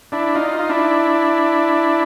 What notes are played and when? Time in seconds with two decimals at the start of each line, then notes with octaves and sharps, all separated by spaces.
0.12 D4 E4
0.35 D#4 F4
0.59 F4
0.69 D4 E4